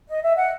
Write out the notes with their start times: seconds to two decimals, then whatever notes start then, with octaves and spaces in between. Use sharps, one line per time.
0.10 D#5
0.23 E5
0.37 F#5